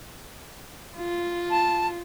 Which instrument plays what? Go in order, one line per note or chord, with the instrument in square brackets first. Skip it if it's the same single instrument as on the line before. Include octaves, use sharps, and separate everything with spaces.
[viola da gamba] F4
[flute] A5